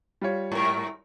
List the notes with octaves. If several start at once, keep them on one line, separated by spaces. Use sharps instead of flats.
G3 F4 C#5
G#2 A#4